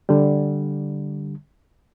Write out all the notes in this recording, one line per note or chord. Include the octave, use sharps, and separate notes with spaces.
D3 G3